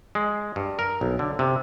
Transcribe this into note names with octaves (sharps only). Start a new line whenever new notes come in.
G#3
G2
A#4
B1
D3
C3